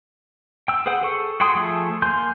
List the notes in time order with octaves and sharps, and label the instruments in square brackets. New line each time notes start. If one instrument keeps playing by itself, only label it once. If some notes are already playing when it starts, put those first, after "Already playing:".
[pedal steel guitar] G5 E6
G#4 B4 C5 F#5 G5
G#4 A4 C#6
F#4 G#4 G5 C6 D#6
F3 A3 G#4 A4
A#3 G#5 C6 G6